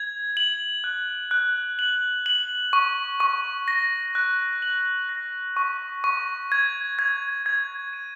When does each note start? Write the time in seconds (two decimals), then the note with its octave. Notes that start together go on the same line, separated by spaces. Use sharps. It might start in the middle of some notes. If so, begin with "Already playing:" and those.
Already playing: G#6
0.37 F#7
0.84 F#6
1.31 F#6
1.79 F#7
2.26 F#7
2.73 C#6
3.20 C#6
3.68 A#6
4.15 F#6
4.62 F#7
5.09 A#6
5.57 C#6
6.04 C#6
6.52 G#6
6.99 G#6
7.46 G#6
7.93 D#7